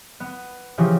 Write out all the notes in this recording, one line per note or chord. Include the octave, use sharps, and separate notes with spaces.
B3
C#3 E3 F3 G4